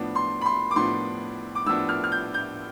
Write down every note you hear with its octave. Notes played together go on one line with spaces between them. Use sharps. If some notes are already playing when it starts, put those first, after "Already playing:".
Already playing: A2 F3 B3 D4
C6
B5
C6
D6
A2 F3 B3 D4 C6
D6
A2 F3 B3 D4 E6
F6
F6
G6
G6